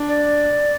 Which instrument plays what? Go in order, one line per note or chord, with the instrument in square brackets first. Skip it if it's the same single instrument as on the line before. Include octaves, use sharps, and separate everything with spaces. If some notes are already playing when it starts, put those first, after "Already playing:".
Already playing: [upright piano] D4
[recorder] D5